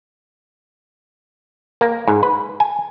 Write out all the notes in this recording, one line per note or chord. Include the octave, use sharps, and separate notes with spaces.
A#3
G#2
B4
G#5